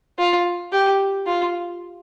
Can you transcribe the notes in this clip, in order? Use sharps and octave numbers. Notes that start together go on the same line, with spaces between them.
F4
G4
F4